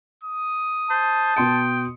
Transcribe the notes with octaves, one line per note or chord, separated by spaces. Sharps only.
D#6
C5 A5
B2 G5 C6 C#7